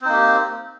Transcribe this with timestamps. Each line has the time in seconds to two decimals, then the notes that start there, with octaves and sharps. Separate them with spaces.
0.02 C4
0.05 D#4
0.09 A#3
0.13 G4